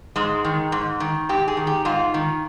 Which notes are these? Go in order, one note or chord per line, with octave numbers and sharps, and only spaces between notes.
G#2 G#3
D#3
G#2
D#3
G#2 G4
G#4
D#3
G4
G#2 F4
D#3